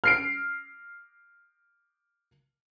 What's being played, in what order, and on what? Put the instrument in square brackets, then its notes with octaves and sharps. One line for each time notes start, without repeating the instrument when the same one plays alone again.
[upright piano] F6 C7 D7